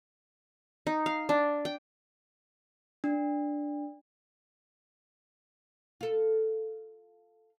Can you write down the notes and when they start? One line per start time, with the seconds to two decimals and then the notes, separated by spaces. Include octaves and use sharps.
0.87 D#4
1.06 F5
1.29 D4
1.65 G5
3.04 D4
6.01 F4 A4